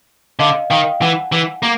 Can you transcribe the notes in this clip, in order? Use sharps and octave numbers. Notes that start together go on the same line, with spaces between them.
D3 D#5 F5
D#3 F5 G5
E3 F#5 G#5
E3
A#3